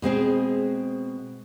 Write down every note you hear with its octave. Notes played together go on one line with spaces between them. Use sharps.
B2 G#3 C4 G#4